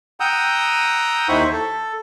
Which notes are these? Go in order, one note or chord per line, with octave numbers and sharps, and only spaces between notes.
F#5 G5 A#5 D#6 E6 G6
D#2 D#4 E4 C5 B5 C#6
A4